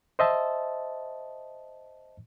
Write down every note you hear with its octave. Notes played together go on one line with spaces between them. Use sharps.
C5 D#5 E5 A5